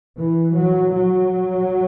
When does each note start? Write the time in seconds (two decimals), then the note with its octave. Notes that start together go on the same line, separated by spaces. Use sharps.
0.19 E3
0.58 F#3
0.96 F#3